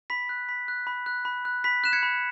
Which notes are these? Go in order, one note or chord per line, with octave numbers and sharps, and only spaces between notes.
B5 B6
F#6
B5 B6
F#6
B5
F#6
B5
F#6
B5 B6
F#6 E7
G#6 C#7
B5